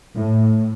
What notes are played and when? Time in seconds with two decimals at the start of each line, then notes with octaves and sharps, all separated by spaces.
0.15 A2